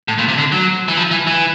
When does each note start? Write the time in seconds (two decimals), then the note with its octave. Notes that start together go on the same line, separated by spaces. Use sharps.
0.08 A2
0.18 A#2
0.28 C3
0.38 D3
0.52 F#3
0.88 E3
0.97 F3
1.11 E3
1.27 E3